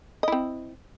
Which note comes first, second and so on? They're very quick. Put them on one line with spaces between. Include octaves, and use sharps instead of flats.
D#5 E4 C4